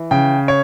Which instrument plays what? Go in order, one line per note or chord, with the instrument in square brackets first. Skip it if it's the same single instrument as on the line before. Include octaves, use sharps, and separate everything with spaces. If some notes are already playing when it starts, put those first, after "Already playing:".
Already playing: [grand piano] E3
C#3 G5
C#5